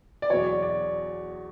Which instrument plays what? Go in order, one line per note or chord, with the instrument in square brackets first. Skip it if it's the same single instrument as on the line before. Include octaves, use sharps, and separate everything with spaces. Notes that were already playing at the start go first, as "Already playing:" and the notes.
[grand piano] D5
[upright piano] E2 B2 F#3 [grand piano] C#5
[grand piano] D5
D5